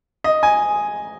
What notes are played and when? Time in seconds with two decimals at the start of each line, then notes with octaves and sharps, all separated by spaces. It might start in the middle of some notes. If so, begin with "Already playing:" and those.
0.24 D#5
0.43 G#5